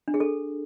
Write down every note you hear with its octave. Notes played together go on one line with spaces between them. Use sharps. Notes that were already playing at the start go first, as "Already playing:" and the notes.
D4
G#4
A4